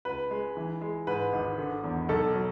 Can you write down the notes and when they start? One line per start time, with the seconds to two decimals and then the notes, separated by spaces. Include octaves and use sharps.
0.05 C#2 B4
0.31 G#3
0.57 E3
0.81 G#3
1.07 G#2 B4
1.33 G#1
1.58 D3
1.84 E2
2.09 B1 A4
2.35 F#3